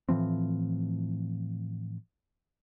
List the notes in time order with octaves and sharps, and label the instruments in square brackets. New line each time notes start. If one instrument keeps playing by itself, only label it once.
[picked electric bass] A2 E3 F3 C4